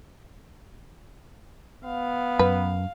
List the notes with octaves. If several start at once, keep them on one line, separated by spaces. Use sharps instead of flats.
B3 F5
F#2 B4